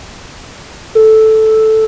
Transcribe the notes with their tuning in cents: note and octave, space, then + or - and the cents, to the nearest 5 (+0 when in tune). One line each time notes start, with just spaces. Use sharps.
A4 -5